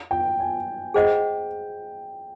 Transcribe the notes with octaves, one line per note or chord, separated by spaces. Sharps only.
G5
G#5
G#4 C5 D#5 F#5 G5